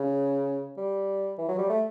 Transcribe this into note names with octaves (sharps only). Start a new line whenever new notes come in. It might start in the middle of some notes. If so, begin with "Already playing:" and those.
Already playing: C#3
G3
E3
F#3
G3
A3